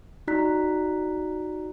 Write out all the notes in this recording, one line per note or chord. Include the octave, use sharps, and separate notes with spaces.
D#4 F#4 D5 A#5 F#6 B6